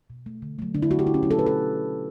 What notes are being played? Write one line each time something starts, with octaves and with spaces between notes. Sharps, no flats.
B2
A3
D3
F#3 A3
D3 D4
E4
F#3 A3 F#4
G4
B2 E4
C#4
F#3 A3 E4
A4
B2 B4
A4